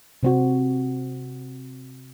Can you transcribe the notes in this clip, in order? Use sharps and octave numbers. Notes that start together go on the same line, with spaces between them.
C3 C4 F#4